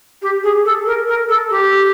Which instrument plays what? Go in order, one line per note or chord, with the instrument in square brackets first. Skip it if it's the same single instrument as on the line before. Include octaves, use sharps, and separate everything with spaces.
[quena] G4
G#4
A4
A#4
A#4
A4
G4